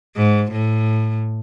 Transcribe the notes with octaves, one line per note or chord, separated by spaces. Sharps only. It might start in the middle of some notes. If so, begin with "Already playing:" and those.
G#2
A2